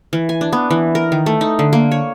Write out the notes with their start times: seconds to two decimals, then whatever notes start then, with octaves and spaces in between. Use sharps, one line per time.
0.13 E3
0.29 G#5
0.41 D4
0.53 B3
0.71 E3
0.95 A#4
1.12 D#3
1.26 A3
1.41 D#4
1.59 D3
1.73 A#3
1.91 C#5